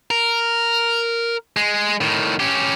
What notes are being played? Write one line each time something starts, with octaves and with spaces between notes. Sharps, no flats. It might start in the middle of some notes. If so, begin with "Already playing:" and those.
A#4
G#3
A2 D#3
C#4 G4